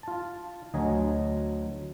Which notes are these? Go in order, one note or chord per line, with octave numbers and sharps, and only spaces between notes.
F4 A5
D2 F#3 D#5 G#5 A#5